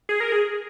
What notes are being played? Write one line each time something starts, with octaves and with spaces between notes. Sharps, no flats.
G#4
A#4
G#4